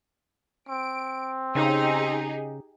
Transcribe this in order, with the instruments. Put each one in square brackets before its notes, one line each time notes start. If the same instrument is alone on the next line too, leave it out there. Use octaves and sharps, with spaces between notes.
[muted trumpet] C4 [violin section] D7
[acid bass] C#3 [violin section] D#4 G4 G#4